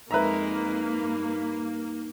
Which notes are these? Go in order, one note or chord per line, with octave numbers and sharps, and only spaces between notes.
F2 G#3 A#3 D#4 A#4 B4 E5 A#5
G2